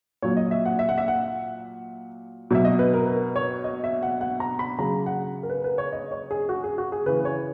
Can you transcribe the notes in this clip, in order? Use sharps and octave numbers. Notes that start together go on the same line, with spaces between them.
A#2 F#3 C#5
D#5
E5
F#5
E5
F#5
E5
F#5
B2 F#3 E5
D#5
B4
A#4
B4
C#5
D#5
E5
F#5
F#5
A#5
B5
C#3 F#3 A#5
F#5
A#4
B4
B4
C#5
D#5
C#5
G#4
F#4
G#4
F#4
G#4
C#3 E3 B4
C#5